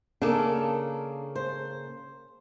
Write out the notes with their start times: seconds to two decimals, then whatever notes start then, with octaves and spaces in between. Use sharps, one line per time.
0.22 C#3 A#3 D4 A4
1.35 C5